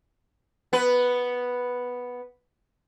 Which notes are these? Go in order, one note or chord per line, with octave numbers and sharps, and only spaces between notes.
B3 B4